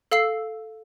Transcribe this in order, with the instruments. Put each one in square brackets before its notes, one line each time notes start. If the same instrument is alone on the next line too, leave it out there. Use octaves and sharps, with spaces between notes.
[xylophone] A4 F5 E6 C7